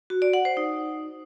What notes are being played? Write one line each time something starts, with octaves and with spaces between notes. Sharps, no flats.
F#4
D5
F#5
C5
D#4